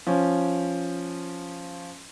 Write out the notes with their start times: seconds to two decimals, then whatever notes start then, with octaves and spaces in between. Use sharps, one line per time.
0.07 F3 C#4